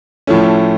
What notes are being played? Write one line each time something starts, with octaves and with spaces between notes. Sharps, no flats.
A2 F3 A3 C#4